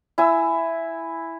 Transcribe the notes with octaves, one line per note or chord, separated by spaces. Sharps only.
E4 G#5 E6